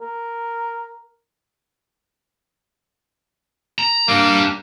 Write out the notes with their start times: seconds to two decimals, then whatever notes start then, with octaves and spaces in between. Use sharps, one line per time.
0.01 A#4
3.79 A#5
4.08 G3 A#3 D4